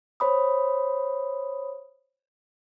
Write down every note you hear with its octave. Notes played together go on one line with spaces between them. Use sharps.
C5 C#5 B5 D#6